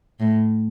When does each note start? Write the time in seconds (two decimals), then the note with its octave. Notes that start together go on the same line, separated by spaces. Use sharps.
0.20 A2